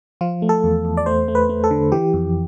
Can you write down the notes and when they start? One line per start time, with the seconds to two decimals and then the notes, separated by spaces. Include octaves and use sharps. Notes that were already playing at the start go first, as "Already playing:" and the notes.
0.21 F3 F4
0.42 A3
0.49 A4
0.64 E2
0.85 E2
0.97 D5
1.06 A3 C5
1.28 A3
1.35 B4
1.49 A3
1.64 A4
1.71 D3
1.92 E3 G4
2.14 F2